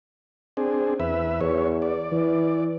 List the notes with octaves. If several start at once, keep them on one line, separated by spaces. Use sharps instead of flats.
C4 D4 G#4
E2 B4 E5
E2 C#5
D5
E3